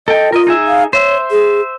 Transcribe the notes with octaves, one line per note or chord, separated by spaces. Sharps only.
A4 D#5 G5
F4 A#4 D#5
D#4 G#4 E5
F5
C5 C#5 E5
G#4